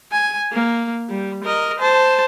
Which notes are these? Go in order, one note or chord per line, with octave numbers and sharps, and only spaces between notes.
G#5
A#3
G3
A#4 D#5
C5 A5